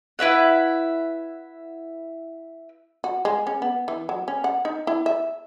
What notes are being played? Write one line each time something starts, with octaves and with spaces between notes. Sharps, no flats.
E4 B4 E5 F#5
F#4
G#3
C#4
B3
E3
F#3
C#4
F#5
D#4
E4
E5